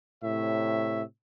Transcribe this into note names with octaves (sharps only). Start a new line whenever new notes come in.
A2 C3 C#5 E5